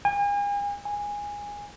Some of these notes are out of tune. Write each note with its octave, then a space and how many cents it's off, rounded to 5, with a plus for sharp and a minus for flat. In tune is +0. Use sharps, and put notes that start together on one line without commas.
G#5 -40
G#5 -15